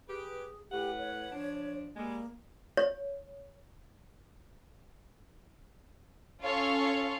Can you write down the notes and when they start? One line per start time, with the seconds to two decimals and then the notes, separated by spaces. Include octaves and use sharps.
0.08 G4 G#4 B4
0.71 A2 G4 B4 F#5
0.99 C#5
1.32 F3 D4
1.96 G3 G#3 A#3
2.77 C#5
6.43 C#4 F4 A4 C#5 F5